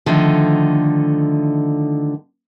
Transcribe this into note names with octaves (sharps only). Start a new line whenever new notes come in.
D3 D#3 F3 A3 D#4